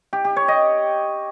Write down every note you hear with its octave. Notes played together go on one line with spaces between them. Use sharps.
G4
G4
C#5
D#5